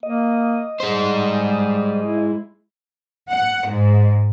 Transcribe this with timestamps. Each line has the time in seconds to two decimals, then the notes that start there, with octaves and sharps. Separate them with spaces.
0.03 A#3 D#5
0.80 G3 G#3 C5
2.03 E4
3.30 F#5
3.67 G#2